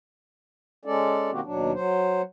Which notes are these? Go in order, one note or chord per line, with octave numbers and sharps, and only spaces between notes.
G#3 C#4 A4 D5
B2 D#3 A#3 C4 F#4 G4
D#2 B2 F#3 D4
F#3 C5